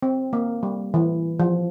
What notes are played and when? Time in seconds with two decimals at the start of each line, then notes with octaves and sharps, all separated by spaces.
0.03 C4
0.33 A#3
0.63 G3
0.94 E3
1.40 F3